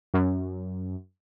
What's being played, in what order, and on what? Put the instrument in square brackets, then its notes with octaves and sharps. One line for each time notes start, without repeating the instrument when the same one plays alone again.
[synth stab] F#2